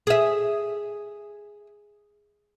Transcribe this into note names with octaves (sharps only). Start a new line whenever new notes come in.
G#4 E5